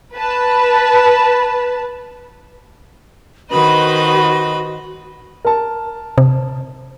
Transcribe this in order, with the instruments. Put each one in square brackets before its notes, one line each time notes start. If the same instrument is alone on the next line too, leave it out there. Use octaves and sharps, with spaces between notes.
[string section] B4 A5
[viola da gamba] D#3 C5 D#5 [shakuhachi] F#4 [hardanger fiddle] B4 B5
[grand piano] A#4 A5
[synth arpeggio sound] C3